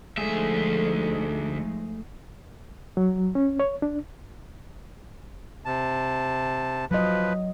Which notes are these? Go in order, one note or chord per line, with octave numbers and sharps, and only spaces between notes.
D2 F3 G#3 A3 D#4 G#4 A4 E5
F#3
C#4
C#5
D4
C3 A5
F3 F#3 B4 D#5